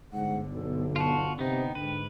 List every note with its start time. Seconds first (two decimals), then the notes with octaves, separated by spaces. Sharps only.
0.13 G1 G#2 D3 F#5
0.51 B1 A4
0.96 F4 F#4 A5
1.39 C3 B3 D#4 G5
1.75 G#2 D3 B4